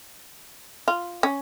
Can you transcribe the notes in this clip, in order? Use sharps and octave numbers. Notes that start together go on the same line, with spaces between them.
F4
C#4